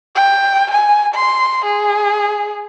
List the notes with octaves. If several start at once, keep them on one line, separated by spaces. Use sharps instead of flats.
G5
G#5
C6
G#4